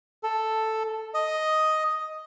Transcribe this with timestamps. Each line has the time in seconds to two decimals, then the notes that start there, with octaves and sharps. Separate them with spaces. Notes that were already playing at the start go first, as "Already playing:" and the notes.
0.23 A4
1.14 D#5